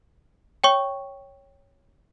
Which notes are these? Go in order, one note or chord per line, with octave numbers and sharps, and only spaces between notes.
C#5 G5 C#6